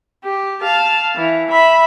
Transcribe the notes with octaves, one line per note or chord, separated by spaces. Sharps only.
G4
F5 A5
E3
E5 B5